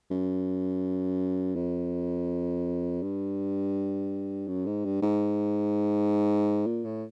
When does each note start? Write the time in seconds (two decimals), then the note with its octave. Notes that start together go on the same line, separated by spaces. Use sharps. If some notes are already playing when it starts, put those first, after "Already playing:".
0.11 F#2
1.56 F2
3.02 G2
4.48 F#2
4.66 G#2
4.85 G2
5.02 G#2
6.66 A#2
6.85 A2